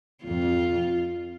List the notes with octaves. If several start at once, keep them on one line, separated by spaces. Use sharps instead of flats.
F2 F4